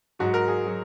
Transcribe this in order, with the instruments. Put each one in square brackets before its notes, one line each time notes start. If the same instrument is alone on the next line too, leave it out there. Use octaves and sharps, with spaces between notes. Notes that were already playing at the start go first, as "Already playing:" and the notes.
[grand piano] G#2 F#3 F#4
A#4
G#4
F#3